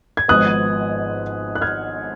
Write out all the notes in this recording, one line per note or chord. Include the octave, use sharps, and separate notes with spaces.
G#6
G#1 G#2 F3 B3 D#6 F#6
F#6
F6 G#6